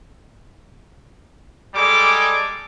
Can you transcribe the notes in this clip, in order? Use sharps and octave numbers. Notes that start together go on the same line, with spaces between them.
G3 G#3 G#4 A4 D6